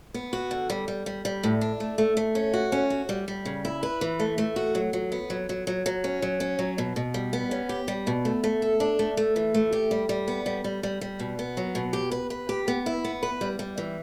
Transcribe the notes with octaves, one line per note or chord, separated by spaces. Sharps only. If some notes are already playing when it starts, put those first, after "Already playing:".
B3
F#4
D3
G3
G3
G3
G3
A2
D4
A3
A3
A3
C#4
F#4
C#4
F#4
G3
G3
C#3
E4
B4
E3
A3
A3
F#4
F#3
F#3
B3
F#3
F#3
F#3
F#3
C#4
F#3
C#4
F#3
B2
B2
G3
B3
C#4
G4
G3
B2
A3
A3
A4
D4
A3
A3
E3
A3
G4
G3
G3
B3
G3
G3
G3
G3
B2
B3
F#3
B2
G4
B4
B4
G4
B3
E4
B3
B4
G3
G3
E3